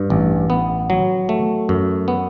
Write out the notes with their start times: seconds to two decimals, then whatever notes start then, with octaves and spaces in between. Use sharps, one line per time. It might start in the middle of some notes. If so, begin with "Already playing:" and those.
Already playing: G2
0.10 A1
0.50 B3
0.90 F#3
1.29 A3
1.69 F#2
2.08 B3